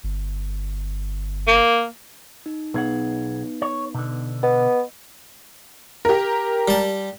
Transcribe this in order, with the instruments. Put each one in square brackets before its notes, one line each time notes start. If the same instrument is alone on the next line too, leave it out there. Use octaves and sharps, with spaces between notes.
[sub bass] G1
[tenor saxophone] A#3
[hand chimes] D#4
[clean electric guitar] B1 G#4 F#5 [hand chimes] B3 D#4 B4
[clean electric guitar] C#5
B2 D3
[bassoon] B3 [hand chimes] D#5
[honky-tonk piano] G4 A#4
[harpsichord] G3 A5